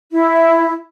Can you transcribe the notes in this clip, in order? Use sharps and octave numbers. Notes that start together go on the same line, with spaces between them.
E4